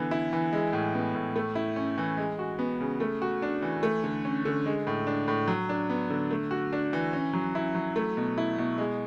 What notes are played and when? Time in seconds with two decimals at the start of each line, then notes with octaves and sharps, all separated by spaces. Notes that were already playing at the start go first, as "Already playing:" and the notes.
Already playing: D3 E3 B3
0.11 E4
0.33 E3
0.53 G#3
0.73 A2
0.95 B3
1.15 A2
1.36 A3
1.55 E4
1.76 C#4
1.98 E3
2.17 G#3
2.39 F#4
2.59 B3
2.80 C#3
3.00 A3
3.22 F#4
3.42 D4
3.62 E3
3.83 A3
4.04 D3
4.25 C#4
4.45 D3
4.66 G#3
4.87 A2
5.07 D4
5.28 A2
5.48 F#3
5.69 D4
5.90 B3
6.10 D3
6.31 A3
6.51 F#4
6.73 D4
6.93 E3
7.13 C#4
7.33 F#3
7.55 E4
7.75 F#3
7.96 A3
8.17 B2
8.38 E4
8.58 B2
8.78 G#3